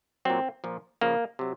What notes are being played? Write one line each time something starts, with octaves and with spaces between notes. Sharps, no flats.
A#2 F#3 C4
A#2 F3
C#3 F3 A#3
C3 F#3